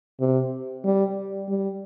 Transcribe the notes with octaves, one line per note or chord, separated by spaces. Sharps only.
C3
G3
G3